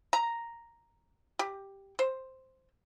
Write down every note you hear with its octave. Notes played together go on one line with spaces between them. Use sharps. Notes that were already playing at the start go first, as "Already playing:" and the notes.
A#5
G4
C5